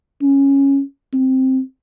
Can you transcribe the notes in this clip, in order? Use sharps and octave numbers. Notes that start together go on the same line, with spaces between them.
C#4
C4